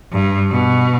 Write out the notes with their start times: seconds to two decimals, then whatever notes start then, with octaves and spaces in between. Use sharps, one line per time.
0.12 G2
0.50 B2